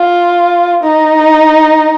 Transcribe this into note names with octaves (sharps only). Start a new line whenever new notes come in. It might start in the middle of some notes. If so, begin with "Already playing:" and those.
Already playing: F4
D#4